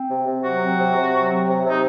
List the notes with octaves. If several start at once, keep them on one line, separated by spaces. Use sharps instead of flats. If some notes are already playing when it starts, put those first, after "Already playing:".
Already playing: C4
C3
C3
F#3 F#4
C4
C3
C3
F#3
C4
C3
C3 D#4